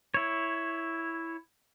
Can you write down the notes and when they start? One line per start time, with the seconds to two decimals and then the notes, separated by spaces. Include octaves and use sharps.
0.14 E4 C#5